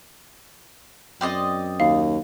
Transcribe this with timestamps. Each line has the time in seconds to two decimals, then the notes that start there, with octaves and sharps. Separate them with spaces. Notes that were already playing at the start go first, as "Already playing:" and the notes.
1.21 F#2 C4 D5 D#5
1.80 D#2 F5